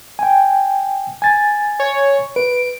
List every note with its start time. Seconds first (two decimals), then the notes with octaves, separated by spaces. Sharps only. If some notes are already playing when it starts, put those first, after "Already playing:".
0.19 G5 G#5
1.22 G#5 A6
1.80 C#5
2.36 B4 D7